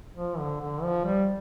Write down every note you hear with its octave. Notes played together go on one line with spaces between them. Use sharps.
F3
D3
D3
F3
G3